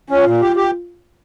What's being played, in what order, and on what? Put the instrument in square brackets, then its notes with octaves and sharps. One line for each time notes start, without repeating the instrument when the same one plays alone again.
[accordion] C#4 [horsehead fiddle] F4
[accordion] A#2
G4
G4